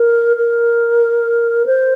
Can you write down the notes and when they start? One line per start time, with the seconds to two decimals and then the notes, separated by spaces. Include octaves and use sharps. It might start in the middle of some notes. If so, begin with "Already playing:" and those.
Already playing: A#4
0.37 A#4
1.66 C5